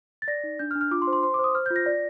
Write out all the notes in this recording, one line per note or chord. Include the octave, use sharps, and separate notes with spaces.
A6
D5 A#6
D#4
D4 G6
F6
D4
F6
F4 D6
C6
C5
C6
C5 C6
D6
C5
D#6
C5 F6
G6
F4
A#6
D5